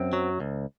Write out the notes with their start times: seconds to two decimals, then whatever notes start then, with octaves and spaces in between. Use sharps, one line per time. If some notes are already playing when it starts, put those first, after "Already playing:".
Already playing: F#2 C4
0.13 F#3
0.40 C#2